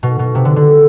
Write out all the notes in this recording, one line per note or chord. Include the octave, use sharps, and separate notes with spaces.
B2
B2
C3
D3
D3